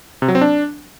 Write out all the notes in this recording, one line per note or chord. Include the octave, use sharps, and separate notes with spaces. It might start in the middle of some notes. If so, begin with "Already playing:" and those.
C3
F#3
C4
D4